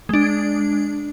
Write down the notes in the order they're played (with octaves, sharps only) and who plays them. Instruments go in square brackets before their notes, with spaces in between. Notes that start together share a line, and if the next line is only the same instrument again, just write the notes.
[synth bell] G#3 D4